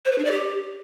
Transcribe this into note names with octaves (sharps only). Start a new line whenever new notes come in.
C5
B4
D4
D5
G4